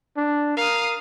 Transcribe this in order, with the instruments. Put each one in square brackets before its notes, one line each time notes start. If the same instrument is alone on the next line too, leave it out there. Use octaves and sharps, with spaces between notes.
[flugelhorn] D4
[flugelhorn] A#4 [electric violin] F5 D#6